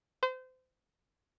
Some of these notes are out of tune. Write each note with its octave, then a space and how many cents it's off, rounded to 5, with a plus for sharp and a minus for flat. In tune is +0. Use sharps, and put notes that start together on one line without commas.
C5 -30